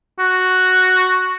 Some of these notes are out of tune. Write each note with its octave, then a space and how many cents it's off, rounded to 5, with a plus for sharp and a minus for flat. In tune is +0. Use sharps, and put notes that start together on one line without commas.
F#4 +0